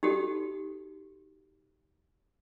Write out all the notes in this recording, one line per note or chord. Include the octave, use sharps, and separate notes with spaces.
D#4 F#4 G4 A4